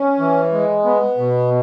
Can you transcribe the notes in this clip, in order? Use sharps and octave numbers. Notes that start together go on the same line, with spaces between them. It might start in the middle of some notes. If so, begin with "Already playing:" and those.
Already playing: C#4
E3
G#3
B3
B2